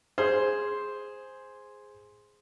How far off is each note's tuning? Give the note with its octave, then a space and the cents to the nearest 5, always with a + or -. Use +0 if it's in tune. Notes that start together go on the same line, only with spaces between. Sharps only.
G#4 +0 C5 +0